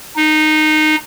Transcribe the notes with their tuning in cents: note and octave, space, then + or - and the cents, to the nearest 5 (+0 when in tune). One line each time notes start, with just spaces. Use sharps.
D#4 -15